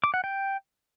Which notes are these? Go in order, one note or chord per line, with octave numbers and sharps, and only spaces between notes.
D6
F#5
G5